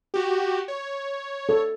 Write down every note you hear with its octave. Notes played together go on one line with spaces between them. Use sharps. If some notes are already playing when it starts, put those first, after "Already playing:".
F#4 G4
C#5
A4